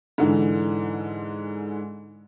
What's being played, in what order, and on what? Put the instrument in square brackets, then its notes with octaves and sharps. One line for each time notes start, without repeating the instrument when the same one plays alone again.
[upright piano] G#2 D3 E3